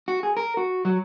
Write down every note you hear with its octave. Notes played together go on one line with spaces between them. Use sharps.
F#4
G#4
A#4
F#4
F#3